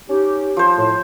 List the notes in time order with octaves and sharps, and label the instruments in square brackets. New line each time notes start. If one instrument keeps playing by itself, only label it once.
[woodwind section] C#4 D#4 G4
[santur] F3 C5
[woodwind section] A2